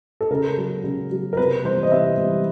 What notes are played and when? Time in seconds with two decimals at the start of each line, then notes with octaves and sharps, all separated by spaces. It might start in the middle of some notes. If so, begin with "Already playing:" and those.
0.21 A4
0.30 C#3 A#4
0.58 F#3
0.84 C#3
1.11 F#3
1.33 A#4
1.37 C3 B4
1.65 E3 G3 C5
1.83 D#5
1.92 C3 E5
2.18 E3 G3